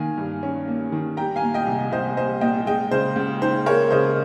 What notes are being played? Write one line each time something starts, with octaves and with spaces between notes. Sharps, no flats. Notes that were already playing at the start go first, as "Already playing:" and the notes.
Already playing: D#3 A#3 F5 G#5
G2
C#4
A#3
D#3
G3 G5 A#5
F5 G#5
A#2
D#5 G5
C2
C2 C5 D#5
G3 C5 D#5
A#2 D#5 G5
G#3 D#5 G5
C#3 C5
C#2
D#4 C5
G#3 A#4 C#5
C#3 C5 D#5